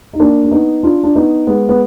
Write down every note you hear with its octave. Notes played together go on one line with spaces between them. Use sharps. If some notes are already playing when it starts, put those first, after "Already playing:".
D#4
A#3 D4
D4
B3 D#4
D4 F4
D4
B3 D#4
G#3 B3
B3